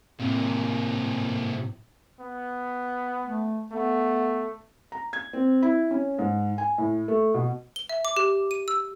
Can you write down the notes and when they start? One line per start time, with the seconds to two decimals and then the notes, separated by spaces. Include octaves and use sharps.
0.19 A2 C3 A#3
2.20 B3
3.25 A3
3.72 A3 B3
4.92 A#5
5.13 G#6
5.33 C4
5.62 E4
5.91 C#4
6.19 G#2
6.58 G#5
6.78 A2
7.08 A3
7.34 B2
7.76 G7
7.89 E5
8.05 D6
8.17 G4
8.51 D#7
8.68 E6